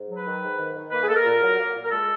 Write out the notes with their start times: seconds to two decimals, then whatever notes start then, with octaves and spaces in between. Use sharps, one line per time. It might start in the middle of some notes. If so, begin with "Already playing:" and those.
Already playing: G#2
0.09 F#3
0.17 B4
0.26 D#3
0.42 G#2
0.58 D#3
0.75 D#3
0.91 A#3 B4
1.02 G#4
1.08 A#3 A4
1.16 A#4
1.25 A#2
1.42 F#3
1.58 A#3
1.74 A#2
1.85 A#4
1.91 G#3 A4